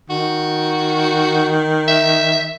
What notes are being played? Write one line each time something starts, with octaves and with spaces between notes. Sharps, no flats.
D#3 F#4
E5